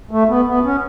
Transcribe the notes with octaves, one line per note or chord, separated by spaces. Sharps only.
A3
B3
B3
C#4